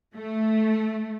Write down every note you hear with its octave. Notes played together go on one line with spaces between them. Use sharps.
A3